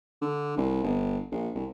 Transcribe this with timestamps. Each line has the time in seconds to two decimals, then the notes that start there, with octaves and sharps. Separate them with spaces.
0.22 D3
0.57 C2
0.84 G1
1.32 A#1
1.55 C2